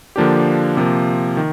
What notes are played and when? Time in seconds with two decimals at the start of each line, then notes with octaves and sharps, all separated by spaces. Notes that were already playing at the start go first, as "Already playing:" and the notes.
0.16 D3 F3 A#3 D4 G4
0.77 C3 F3 A#3
1.37 D#3